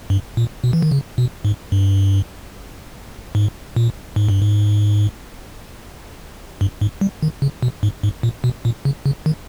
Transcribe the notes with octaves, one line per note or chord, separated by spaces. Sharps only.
G2
A#2
B2
E3
D#3
C#3
B2
G#2
G2
G#2
A#2
G#2
G2
G#2
G2
G#2
G3
D#3
C#3
B2
G#2
G#2
A#2
B2
A#2
C#3
C#3
D#3